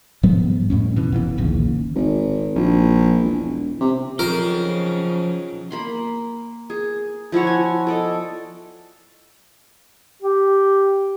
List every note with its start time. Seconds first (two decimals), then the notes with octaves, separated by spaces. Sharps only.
0.23 G#2 F3 G3 B3
0.70 F2 A2 C#4
0.96 B2 E3
1.12 E1 E2 E3
1.38 D1 A#1 D#2 C#3
1.95 G#1
2.56 A#1
3.24 E1
3.81 C3
4.19 C#3 F3 F#3 D#4 F4 A#4 G5
5.71 A#3 B5 C6
6.70 G#4
7.32 F3 E4 F#4 C#5
7.47 G#5
7.87 A4 D5 D#5
10.22 G4